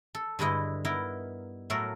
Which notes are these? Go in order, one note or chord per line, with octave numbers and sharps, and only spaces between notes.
A4
G2 D3 G#3 E4 D#5
B3 D#4 E4 A#4
A2 F#3 A3 A4 A#4